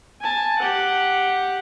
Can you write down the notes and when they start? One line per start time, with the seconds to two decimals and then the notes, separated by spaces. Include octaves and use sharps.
0.22 G#5 A5
0.59 G4 F#5